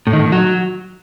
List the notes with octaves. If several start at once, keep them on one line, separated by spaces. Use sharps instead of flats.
A2
D#3
A2
D#3
F#3